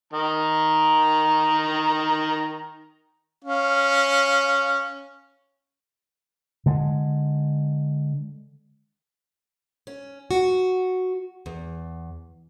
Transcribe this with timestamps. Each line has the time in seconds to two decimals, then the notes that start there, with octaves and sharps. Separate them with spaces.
0.13 D#3 A#5
3.45 C#4 F5
6.66 D3 G#3
9.87 C#4
10.31 F#4
11.46 E2